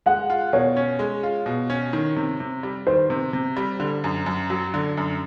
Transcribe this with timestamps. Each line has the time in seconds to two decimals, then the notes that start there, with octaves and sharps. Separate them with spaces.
0.06 G#3 F#5
0.30 F4
0.53 B2 C#5
0.76 C#4
0.99 G#3
1.23 F4
1.46 B2
1.70 C#4
1.93 D#3
2.16 C3
2.40 C3
2.63 G3
2.87 D#3 C5
3.10 C3
3.33 C3
3.57 G3
3.80 D3
4.04 F#2
4.26 F#2
4.50 F#3
4.74 D3
4.97 F#2